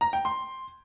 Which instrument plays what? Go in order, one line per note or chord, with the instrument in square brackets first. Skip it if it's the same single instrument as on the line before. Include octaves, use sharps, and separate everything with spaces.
[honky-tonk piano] A#5
G5
C6